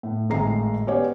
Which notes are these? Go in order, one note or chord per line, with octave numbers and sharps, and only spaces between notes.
A2
G#1 A2 D#3 G#3 A#5 C7
B3 C#4 G4 C#5 D5